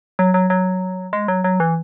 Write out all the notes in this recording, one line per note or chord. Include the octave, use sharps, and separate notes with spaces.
F#3
F#3
F#3
G#3
F#3
F#3
E3